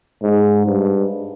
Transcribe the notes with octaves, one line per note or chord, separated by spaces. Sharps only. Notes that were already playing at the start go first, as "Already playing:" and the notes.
G#2
G2